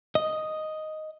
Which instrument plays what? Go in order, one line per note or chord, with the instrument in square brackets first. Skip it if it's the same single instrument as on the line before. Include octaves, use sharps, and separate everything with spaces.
[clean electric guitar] D#5